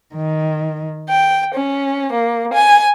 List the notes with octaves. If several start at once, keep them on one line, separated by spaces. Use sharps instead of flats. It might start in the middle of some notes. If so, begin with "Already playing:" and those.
D#3
G5
C#4
A#3
G#5